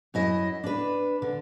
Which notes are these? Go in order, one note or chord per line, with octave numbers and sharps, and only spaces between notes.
F#2 E4 D#5
D4 B4
D3